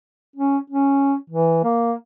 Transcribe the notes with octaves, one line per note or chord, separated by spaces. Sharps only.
C#4
C#4
E3
A#3